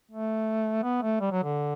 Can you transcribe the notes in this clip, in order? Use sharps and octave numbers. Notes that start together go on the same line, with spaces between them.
A3
B3
A3
G3
F#3
D3